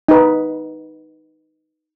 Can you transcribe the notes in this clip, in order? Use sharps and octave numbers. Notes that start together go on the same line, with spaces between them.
D#4 B4